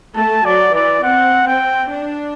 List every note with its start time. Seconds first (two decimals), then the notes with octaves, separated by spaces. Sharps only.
0.16 A3 A5
0.45 F#3 D5
0.75 E3 D5
1.03 C4 F#5
1.47 C4 G5
1.91 D4